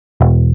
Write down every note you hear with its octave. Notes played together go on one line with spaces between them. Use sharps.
E1